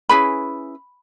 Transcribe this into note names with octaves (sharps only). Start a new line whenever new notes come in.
C#4 E4 G#4 B4 B5